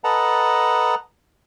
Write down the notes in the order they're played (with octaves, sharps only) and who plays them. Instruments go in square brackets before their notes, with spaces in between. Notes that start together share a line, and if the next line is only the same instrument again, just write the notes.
[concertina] A4 B4 D#5 F#5 A5 A#5